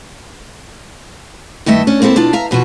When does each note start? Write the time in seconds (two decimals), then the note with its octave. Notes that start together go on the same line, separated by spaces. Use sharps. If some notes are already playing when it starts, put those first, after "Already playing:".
1.66 G2 D#3 A3 D#5 E5
1.87 C#4 D4
2.02 A#3 C4 E4 A4 C5
2.16 B2 D4 F4 A5
2.33 E5 F5 A#5
2.51 E2 B2 F3 F#4